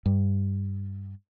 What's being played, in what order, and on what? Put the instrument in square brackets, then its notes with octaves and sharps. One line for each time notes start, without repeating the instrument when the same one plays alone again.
[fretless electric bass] G2